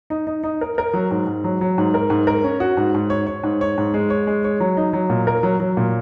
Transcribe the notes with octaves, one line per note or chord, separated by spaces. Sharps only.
D#4
D#4
D#4
A#4
A#4
F#3
G#2
G#2
F#3
F#3
G#2
A#4
G#2
A#4
C#4
F#4
G#2
G#2
C#5
C#5
G#2
C#5
G#2
G#3
C#5
G#3
C#5
F#3
D#4
F#3
A#2
A#4
F#3
F#3
A#2